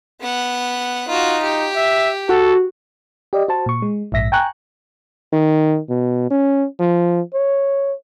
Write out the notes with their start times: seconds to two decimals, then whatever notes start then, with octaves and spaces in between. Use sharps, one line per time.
0.21 B3 F#5
1.08 D#4 F4 F#4
1.42 G4
1.76 E5
2.29 F#4 A4
3.33 G4 D5 D#5
3.48 F#4 C5 A5
3.66 A#2 C#6
3.82 G#3
4.12 A#1 G#2 E5 A#6 B6
4.32 G5 G#5 A#5 C#6 F#6
5.33 D#3
5.89 B2
6.30 C#4
6.79 F3
7.34 C#5